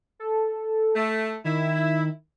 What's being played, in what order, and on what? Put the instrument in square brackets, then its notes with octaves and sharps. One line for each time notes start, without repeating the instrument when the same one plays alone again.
[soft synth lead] A4
[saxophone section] A3
[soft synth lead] D#3 [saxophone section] E4